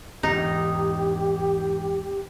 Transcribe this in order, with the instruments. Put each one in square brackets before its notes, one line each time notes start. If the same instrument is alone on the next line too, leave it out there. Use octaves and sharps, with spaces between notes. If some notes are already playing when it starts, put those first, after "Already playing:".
[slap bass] E2 G#2 [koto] D#4 [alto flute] G4